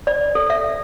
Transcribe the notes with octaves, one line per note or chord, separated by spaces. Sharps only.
D5
A4
E5